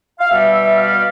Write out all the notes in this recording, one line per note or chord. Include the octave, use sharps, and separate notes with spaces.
F5
B2 G3 E5
E5
F5